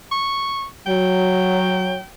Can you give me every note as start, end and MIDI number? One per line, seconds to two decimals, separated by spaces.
0.12 0.65 85
0.86 1.97 54
0.86 2.08 79